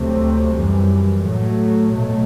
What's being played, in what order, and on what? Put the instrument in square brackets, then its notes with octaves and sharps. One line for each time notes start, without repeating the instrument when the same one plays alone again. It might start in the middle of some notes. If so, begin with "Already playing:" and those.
Already playing: [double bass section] D2 C3 F#3 A3 C4
F#2 E3 G3
A2 F#3 A3
B2 F#3 A3